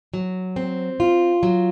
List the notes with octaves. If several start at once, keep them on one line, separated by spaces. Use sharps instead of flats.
F#3
C4
F4
F#3